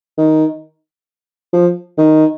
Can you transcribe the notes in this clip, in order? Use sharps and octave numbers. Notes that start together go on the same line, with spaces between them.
D#3
F3
D#3